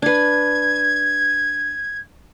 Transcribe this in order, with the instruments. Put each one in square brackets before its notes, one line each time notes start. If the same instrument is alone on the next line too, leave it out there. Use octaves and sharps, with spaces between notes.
[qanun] D4 B4 [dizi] G#6